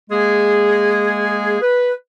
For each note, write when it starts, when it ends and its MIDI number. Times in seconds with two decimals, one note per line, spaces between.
0.10 1.60 56
0.10 1.60 58
0.10 1.60 68
1.61 1.92 71